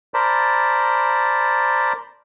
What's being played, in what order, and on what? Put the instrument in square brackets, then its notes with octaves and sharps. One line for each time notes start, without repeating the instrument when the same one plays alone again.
[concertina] A#4 C5 D5 A5 B5